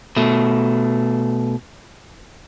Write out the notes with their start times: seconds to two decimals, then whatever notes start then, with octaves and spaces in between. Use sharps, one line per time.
0.16 B2 A3